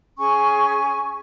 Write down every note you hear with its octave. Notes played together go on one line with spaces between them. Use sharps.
C#4 G#4 G#5 C#6